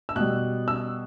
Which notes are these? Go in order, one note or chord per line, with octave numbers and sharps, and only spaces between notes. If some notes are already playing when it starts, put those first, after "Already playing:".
E6
B2 G3 F#6
E6